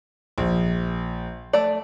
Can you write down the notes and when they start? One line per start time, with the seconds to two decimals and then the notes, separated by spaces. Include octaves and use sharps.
0.38 A#1
1.53 A3 D5